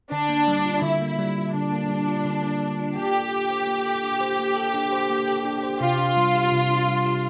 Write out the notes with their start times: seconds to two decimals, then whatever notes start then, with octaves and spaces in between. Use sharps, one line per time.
0.11 D3 D4
0.29 A#3
0.48 G3
0.65 F4
0.82 D3 E4
1.01 A#3
1.19 G3
1.36 F4
1.54 D3 D4
1.72 A#3
1.89 G3
2.08 F4
2.25 D3
2.43 A#3
2.60 G3
2.79 F4
2.96 A#3 G4
3.14 A4
3.32 D4
3.50 C5
3.67 A#3
3.85 A4
4.04 D4
4.20 C5
4.39 A#3
4.56 A4
4.74 D4
4.92 C5
5.10 A#3
5.28 A4
5.45 D4
5.63 C5
5.81 C3 F4
5.98 D4
6.17 G3
6.35 G4
6.52 C3
6.70 D4
6.88 G3
7.05 G4